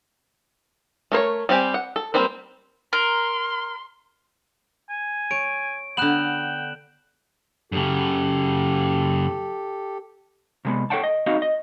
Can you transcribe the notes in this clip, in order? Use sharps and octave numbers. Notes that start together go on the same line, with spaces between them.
A3 A#4 C5 C#5
G3 C4 G4 G#5
F#5
A4
G3 A#3 C4 B4 C5
A#4 C6
G#5
C#5 D7
D3 B3 G5 F#6 E7 F#7
F#2 C#3 G4 A4
C3 G#3 B3
A4 B4 C#5 F#5 G5 A5
D#5
C4 D#4 F#4 D#5 F5
D#5